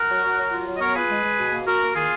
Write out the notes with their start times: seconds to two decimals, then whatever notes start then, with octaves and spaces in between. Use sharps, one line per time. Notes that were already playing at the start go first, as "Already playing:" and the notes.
Already playing: F#4 A#4
0.09 F#3
0.23 F#3
0.37 F#3
0.51 F4
0.67 F#3
0.75 D#5
0.80 B3 A#4 C#5
0.95 F4 G#4 B4
1.09 G#3
1.24 G#3
1.38 B2
1.52 A#3
1.66 A#3 F#4 A#4
1.82 A#3
1.95 D#3 F4 G#4